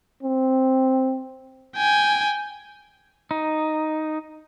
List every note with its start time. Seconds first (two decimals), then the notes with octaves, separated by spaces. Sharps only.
0.23 C4
1.76 G5 G#5
3.31 D#4